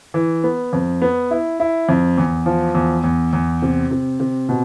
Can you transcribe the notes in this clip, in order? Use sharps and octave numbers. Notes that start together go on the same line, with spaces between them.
E3
B3
F2
B3
E4
E4
F2
E2
F3
E2
E2
E2
C3
C3
C3
B2